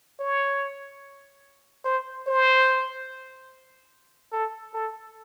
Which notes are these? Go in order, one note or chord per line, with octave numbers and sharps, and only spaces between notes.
C#5
C5
C5
A4
A4